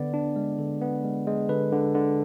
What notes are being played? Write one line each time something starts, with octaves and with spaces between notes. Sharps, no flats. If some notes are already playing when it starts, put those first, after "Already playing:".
Already playing: D3 B3 D5
D4
G#3
D3
B3
G#3
G#3
D3 B4
D3
D3